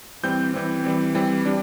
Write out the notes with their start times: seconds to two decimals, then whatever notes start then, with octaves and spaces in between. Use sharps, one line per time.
0.23 E3 G3 C4 G6
0.54 E3 G3 C4
0.84 E3 G3 C4
1.15 E3 G3 C4
1.45 G3 D4